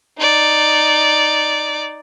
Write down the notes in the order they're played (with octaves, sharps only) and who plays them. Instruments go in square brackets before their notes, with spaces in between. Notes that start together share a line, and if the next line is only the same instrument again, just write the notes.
[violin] D#4 D5